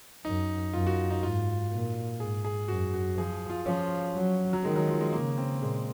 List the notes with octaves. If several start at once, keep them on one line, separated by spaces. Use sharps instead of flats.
F#2 D#4
F#2 F4
F#4
D#4
G#2 F4
A#2
G#2 G#4
G#4
F#2 F#4
F#4
F3 G#4
F4
F3 C#4
F#3
F#3
D#3 G#3
F#3
F3
G#3
C#3 A#3
C4
A#2 G#3